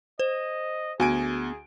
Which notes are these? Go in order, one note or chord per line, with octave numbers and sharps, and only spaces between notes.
C5 D#5
D2 B3 F#4 G#4 G#5 D7